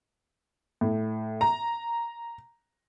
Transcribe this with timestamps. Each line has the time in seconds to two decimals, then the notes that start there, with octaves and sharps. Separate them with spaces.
0.81 A2
1.41 A#5